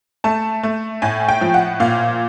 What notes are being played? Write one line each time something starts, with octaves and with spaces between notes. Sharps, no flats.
A3 A5
A3
A2 G#5
G5
F3
F#5
A#2 F5